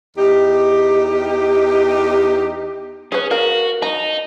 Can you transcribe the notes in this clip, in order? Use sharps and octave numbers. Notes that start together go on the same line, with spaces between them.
E2 D#4 G4
C#4 G#4 B4
F#4 A#4 F5
D#4 A#5